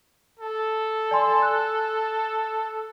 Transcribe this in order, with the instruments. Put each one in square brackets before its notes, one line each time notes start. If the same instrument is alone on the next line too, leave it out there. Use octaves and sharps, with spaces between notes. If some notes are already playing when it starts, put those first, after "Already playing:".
[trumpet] A4
[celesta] D5 G#5 C6
F#6